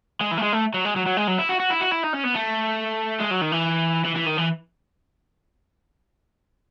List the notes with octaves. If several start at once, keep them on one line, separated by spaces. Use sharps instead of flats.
G#3
E3
A3
G#3
A3
F#3
G#3
F#3
F#3
G#3
F#3
E4
F#4
F#4
E4
F#4
E4
D#4
C#4
B3
A3
G#3
F#3
D#3
E3
E3
E3
D#3
E3